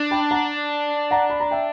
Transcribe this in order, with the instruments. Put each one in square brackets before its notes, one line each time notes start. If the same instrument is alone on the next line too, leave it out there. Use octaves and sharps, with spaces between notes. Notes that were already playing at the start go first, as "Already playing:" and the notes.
Already playing: [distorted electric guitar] D4
[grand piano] G5 B5
F#5 A#5
F#5 A#5
B5
A#5
E5 G5